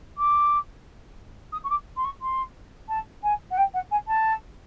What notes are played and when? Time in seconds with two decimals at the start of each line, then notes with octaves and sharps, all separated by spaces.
0.17 D6
1.52 D#6
1.63 C#6
1.69 D6
1.96 C6
2.04 C#6
2.21 C6
2.88 A5
3.23 G#5
3.50 F#5
3.57 G5
3.73 F#5
3.91 G#5
4.07 A5